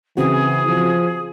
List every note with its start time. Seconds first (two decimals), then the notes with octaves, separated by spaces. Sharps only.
0.17 C#3 E3 C4 F#4 G#4
0.68 F3